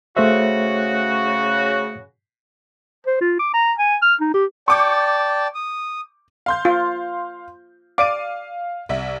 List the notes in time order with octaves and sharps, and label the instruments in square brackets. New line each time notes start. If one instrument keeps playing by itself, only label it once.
[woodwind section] C#3 F#4 [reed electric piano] A3 C5 E5
[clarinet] C5
F4
D6
A#5
G#5
F6
D#4
G4
[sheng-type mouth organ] D5 G5 A5 [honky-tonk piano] C#6 D6 G6
[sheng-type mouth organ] D#6
[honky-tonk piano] F5 C6 G6
[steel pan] F4
[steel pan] D5 D6 [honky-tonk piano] F5 D#7
[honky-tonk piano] C2 E5